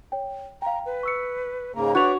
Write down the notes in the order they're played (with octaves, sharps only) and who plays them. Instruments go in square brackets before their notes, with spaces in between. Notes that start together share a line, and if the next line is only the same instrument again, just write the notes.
[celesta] C#5 G5
[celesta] F5 G5 [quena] A#5
[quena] B4
[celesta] C#6 E6 C#7
[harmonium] G#2 C#3 A#3 [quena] A#5
[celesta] D4 F7 [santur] F#4 [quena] B4 [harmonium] C#5 D5